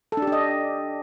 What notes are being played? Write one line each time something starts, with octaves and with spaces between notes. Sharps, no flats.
A4
D4
G4
D4
D#5